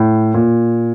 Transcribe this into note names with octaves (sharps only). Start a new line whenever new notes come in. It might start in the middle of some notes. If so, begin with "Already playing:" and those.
Already playing: A2
A#2